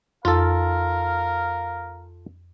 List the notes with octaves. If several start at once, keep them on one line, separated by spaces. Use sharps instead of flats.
F2 F4 A4 A#4 F5